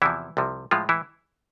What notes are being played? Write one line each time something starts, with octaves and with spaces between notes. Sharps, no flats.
E2 C3 E3 F3 E4
C2 C3 F3
A2 F3 G#3 F4
E3 E4